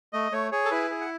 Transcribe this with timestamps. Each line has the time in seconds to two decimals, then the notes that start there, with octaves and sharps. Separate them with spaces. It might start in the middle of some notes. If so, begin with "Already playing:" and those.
0.13 A3 D#5
0.32 A3 C#5
0.52 G#4 C#5
0.65 A4
0.71 E4 B4
0.90 G#4
1.01 F#5